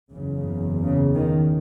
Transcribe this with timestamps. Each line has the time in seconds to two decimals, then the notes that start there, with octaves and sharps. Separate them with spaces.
0.12 F#1 E2 C#3
0.81 C#3
1.15 D#3